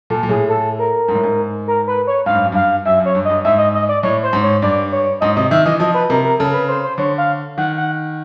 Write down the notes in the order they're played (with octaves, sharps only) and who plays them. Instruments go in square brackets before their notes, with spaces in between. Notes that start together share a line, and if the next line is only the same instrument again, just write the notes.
[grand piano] A#2 [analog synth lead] A4
[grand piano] A#2
[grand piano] A2 [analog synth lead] G#4
[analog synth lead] A4
A#4
[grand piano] G#2
A2
G#2
[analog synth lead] A#4
B4
C#5
[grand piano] G#2 [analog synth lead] F5
[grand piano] G2
F#2
[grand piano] G2 [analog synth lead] F5
[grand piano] F#2 [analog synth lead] E5
[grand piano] F#2
[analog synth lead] C#5
[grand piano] G2
[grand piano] G2 [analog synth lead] D#5
[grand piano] G#2 [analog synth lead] E5
[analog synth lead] D#5
D#5
D5
[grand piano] A2 [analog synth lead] C#5
[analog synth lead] C5
[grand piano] G#2
[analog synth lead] C#5
[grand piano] G2 [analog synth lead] D5
[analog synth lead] C#5
[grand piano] G#2 [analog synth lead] D#5
[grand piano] C3 [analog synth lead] D#5
[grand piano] D#3 [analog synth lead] E5
[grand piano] E3 [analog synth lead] D#5
[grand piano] F3 [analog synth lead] D#5
[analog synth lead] B4
[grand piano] C3 [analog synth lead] A#4
[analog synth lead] A#4
[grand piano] C#3 [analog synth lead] A4
[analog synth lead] B4
C5
C5
[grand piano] D3 [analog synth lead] C#5
[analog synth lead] F5
[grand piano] D#3 [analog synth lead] F#5
[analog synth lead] F#5